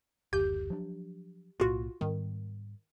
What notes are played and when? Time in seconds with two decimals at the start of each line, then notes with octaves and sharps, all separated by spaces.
0.33 F#1 D2 G4 G6
0.70 F3 F#3 D4
1.60 B1 A2 A#3 F4 F#4
2.01 G#2 D#3 G3 B3